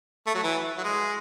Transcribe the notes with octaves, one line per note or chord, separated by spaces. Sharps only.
A3
F#3
E3
F#3
G#3